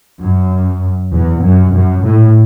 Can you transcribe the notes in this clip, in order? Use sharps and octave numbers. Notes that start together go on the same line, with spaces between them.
F#2
E2
F#2
F#2
A2